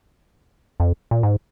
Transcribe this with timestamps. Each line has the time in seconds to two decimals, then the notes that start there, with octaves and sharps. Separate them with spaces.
0.80 F2
1.11 A#2
1.23 G#2